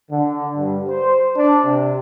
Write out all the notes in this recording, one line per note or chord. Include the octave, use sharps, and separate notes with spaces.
D3
G2
C5
D4
C3